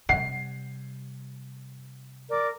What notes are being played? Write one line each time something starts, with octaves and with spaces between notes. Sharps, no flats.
C3 G3 F#5 C7
A#4 D5 D6